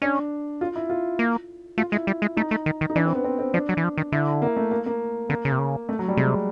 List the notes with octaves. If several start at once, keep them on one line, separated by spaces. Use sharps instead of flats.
C#4 D4
F4
E4
F4
A#3
A3 F4
G#3 E4
G3
G#3
A3 D#4
A3
D#3
D#3
D#4
E3 D4
C4
B3
C4
C4
F3 D4
F#3
E3
F3
D#3
D3 E4
A#3
A3
A#3
A#3
D3 A#3
C#3
C3
C#3
A3
F#3
G3
C3 G#3